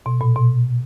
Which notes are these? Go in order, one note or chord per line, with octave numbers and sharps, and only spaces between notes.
B2
A#2
B2